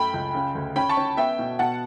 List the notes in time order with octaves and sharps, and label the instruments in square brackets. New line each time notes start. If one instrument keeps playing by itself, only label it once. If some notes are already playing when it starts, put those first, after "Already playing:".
Already playing: [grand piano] F#2 A3 G5 B5
C#2
C#3
D2
C#4 G5 B5
A5 C#6
C#4
B3 E5 G5
B2
B2 F#5 A5